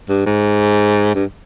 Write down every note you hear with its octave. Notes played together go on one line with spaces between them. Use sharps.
G2
G#2
G2